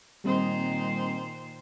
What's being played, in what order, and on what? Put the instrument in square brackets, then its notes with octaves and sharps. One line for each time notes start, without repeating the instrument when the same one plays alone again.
[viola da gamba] A#2 D#3 C5 [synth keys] G3 C4 D#5